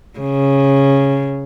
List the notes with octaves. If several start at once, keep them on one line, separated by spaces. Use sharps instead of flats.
C#3